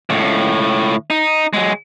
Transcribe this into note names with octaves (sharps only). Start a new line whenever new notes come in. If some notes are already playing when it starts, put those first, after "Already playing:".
C#2 A2
D#4
F#3 G#3